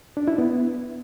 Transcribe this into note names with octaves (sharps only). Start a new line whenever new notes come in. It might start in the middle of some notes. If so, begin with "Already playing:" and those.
D4
E4
B3